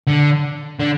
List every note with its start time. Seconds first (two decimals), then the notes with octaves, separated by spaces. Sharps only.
0.07 D3
0.80 D3